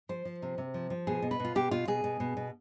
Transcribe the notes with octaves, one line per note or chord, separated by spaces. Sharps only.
F3 C5
F3
C3
C3
F3
F3
B2 G#4
B2
B4
B2 F4
B2 G4
B2 F4
B2 G#4
B2
B2
B2